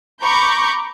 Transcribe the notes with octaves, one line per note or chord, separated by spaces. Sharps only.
A#5 B5 C#6 D6 G6